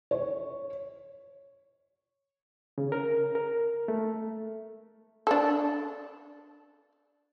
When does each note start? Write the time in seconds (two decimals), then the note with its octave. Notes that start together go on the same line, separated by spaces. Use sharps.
0.11 C#5
2.78 C#3
2.92 A#4
3.35 A#4
3.88 A3
5.27 D4 A4